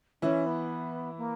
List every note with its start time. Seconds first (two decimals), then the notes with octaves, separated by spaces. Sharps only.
0.22 E3 C#4 E4
0.46 B3
1.18 A#3